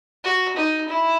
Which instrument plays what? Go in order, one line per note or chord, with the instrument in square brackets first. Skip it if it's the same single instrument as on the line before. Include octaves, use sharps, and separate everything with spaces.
[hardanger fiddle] F#4
D#4
E4